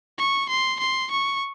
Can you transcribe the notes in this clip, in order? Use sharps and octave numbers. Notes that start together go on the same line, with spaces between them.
C#6
C6
C6
C#6